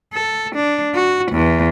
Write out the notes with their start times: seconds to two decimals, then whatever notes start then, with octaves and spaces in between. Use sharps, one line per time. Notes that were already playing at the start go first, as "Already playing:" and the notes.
0.13 A4
0.55 D4
0.94 F#4
1.32 E2